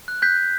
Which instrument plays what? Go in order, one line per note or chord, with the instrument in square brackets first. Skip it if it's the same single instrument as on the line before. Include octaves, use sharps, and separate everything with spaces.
[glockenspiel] F#6
F#6 G6 B6
F#6